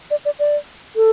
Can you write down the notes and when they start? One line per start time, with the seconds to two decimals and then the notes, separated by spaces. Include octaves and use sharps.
0.11 D5
0.25 D5
0.39 D5
0.96 A4